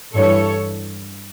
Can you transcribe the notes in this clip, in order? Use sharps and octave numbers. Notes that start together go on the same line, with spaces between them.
G2 E3 G3 A4 C#5